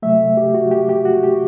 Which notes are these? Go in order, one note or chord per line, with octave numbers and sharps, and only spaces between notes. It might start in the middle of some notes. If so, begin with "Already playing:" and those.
C3 F#3 A3 E5
G4
F#4
G4
G4
F#4
G4